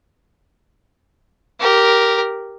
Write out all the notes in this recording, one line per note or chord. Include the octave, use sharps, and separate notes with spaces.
G4 A#4